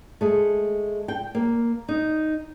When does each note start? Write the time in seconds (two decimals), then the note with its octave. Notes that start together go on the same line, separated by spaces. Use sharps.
0.21 G#3 A3
1.08 G5
1.35 A#3
1.89 D#4